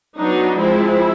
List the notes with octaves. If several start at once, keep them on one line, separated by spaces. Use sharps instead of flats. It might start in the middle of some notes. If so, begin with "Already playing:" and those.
F#3 B3 D4 D#4
F3 G#3 C4 E4